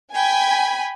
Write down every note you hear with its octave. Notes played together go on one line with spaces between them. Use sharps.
G5 G#5 B5